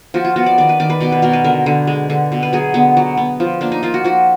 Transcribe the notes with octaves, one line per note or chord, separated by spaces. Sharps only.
F3 F#4
F4
B3 F#4
D5
D#3 D5
B4
D#3 D5
B4
B2 D5
B4
B2 A#4
B4
D3 A#4
D3
G#3
D3
B2
B4
F#3 G#4
D3 B3
F#3
B3
F3
A#3 D4
D#4
A#3 F4
F#4
F3 F#4